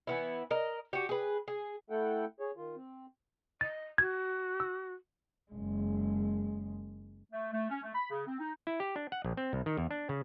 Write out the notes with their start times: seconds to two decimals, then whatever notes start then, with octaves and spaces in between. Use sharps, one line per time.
0.07 E3 B3 E4
0.51 A#4 D#5
0.93 F#4 G4
1.09 G#4 B4
1.48 G#4
1.90 A3 E4 A4 F#5 G5
2.40 G#4 C#5
2.57 D#3 F4
2.76 C4
3.61 D#5 A6
3.98 F#4 G#6
4.60 E6
5.52 F#1 G#3
7.32 A3
7.52 A3
7.70 C#4
7.83 A3
7.95 B5
8.10 C#3
8.27 C4
8.39 D#4
8.67 E4
8.80 G4
8.96 D4
9.12 F#5
9.25 A#1
9.37 C4
9.53 C2
9.66 D#3
9.77 E2
9.91 D4
10.09 C#3